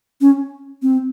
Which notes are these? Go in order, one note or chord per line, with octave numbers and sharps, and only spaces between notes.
C#4
C4